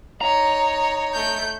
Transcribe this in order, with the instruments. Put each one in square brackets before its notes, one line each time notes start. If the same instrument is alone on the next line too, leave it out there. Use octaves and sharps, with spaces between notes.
[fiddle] D#4 C#5 [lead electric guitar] A#5
[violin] A3 G6